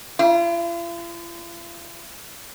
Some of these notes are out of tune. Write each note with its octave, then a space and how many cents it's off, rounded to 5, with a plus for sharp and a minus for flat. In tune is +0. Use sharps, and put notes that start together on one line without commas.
F4 -45